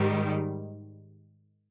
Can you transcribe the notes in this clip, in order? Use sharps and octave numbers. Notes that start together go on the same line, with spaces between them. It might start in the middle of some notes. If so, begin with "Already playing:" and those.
Already playing: G#2 D#3 G3